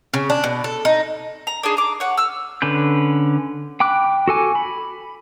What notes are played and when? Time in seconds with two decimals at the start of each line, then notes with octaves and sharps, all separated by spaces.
0.14 C#3
0.30 D4
0.44 B2
0.64 A4
0.85 D#4
1.47 A#5
1.63 D4 D#4 G#4
1.77 A#5 D6
2.00 C#5 F#5
2.17 E6 F6
2.62 D3 C#4 B4 G6
3.80 G5 B5 D6 F#6
4.28 F#4 A4 G#5 D6
4.55 B5